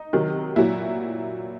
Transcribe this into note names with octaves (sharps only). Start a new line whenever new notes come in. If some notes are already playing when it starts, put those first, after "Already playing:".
Already playing: D#4
C3 D#3 F#3
A#2 F#3 E4